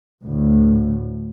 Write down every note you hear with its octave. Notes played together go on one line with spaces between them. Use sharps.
D2 A2